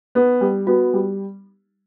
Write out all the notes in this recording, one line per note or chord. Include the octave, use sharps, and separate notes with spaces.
B3
G3
B3 F#4
G3